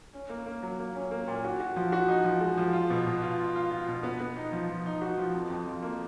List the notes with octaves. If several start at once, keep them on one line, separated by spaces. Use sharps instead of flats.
C#4
A#3
A#3
F#3
A#3
C#4
A#3
A#2
F#4
F#4
F3
F#4
D#4
F3
G#3
F3
F4
B2
B2
F4
F4
F4
F4
B2
B3
B3
D#4
F3
F3
D#4
F#4
F3
F2
F2
F3
A#3